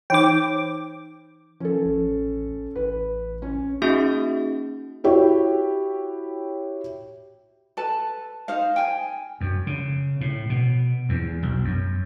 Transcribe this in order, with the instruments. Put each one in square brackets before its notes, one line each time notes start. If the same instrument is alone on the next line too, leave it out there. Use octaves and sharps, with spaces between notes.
[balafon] E3 D#4 C5 [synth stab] G5 D6
[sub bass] F3 [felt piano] C#4 A4
[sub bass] A1
[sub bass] A1 [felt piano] B4
[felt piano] C#4
[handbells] A#3 C#4 D#4 F#4 G#4 E5
[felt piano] E4 F#4 G4 C#5
[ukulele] A4 B4 A5
D#4 C5 F5
G5 G#5
[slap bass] F#2
C#3
A2
B2
E2
B1
F#2